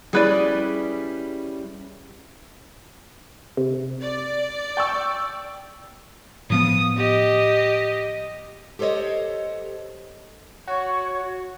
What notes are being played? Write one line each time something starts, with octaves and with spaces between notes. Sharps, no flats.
G3 C#4 E4 G#4 B4 D5
C3
D5
G5 C#6 E6
A2 F3 B3 D#6
G4 D#5
G4 A4 C5 C#5 D#5
F#4 C#5